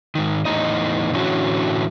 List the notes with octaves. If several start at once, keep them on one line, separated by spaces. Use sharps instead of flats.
G#2 D#3
E2 A2 G#3 D#4 D#5
A2 D3 E3 A3 C#4 F#4